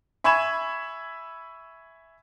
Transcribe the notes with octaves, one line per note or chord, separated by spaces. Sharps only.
E5 G#5 B5 C#6 G#6 E7